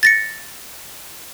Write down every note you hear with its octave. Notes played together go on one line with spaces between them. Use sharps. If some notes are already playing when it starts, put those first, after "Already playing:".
A6 A#6 C#7